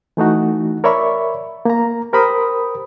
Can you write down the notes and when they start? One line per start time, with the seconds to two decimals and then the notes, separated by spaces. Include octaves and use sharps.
0.17 E3 A3 D#4 F#4
0.84 A#4 C#5 D5 E5 B5 C#6
1.65 A#3 A#5
2.13 G4 A#4 C5 B5 D#6